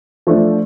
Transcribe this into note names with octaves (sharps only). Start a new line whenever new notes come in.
F3 A3 D4